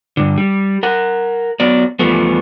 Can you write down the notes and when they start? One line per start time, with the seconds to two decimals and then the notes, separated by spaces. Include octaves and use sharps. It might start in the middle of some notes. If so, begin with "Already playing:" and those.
0.17 G2 D3
0.38 G3
0.83 A#4 F#5
1.60 F#3 B3 D5
1.99 E2 F3 G3 A3 B3